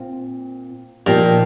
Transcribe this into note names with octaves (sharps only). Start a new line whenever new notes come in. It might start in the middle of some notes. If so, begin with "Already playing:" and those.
Already playing: A#2 C4
A#2 F3 D#4 G4 A#4